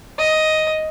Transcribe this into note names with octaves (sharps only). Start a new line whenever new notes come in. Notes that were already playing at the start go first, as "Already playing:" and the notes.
D#5